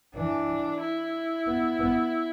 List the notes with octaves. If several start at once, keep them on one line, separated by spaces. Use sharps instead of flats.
E3 D4
E4
B3
B3